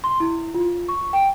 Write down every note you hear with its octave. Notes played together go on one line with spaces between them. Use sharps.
C6
E4
F4
C#6
G5